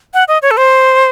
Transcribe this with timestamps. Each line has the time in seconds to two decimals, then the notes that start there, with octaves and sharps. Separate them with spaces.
0.14 F#5
0.28 D#5
0.42 C#5
0.51 A4
0.57 C5